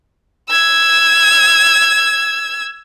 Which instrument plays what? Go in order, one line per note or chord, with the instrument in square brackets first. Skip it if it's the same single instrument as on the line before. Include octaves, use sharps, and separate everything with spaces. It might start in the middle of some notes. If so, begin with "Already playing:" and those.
[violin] E6 G#6